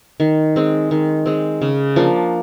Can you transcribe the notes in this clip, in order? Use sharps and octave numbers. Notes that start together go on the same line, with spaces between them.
D#3
G#3 C4
D#3
G#3 C4
C#3
F3 A#3 D4